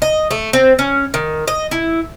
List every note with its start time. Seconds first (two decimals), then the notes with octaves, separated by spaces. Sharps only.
0.02 D#5
0.31 A3
0.53 C4
0.79 C#4
1.14 D#3
1.48 D#5
1.71 E4